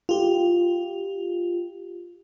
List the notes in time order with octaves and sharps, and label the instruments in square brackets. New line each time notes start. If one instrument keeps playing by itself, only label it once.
[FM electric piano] F4 G4